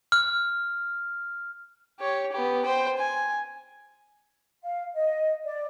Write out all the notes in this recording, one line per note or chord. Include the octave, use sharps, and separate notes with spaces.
F6
G4 C#5
B3 G4
C5 G5
G#5
F5
D#5
D5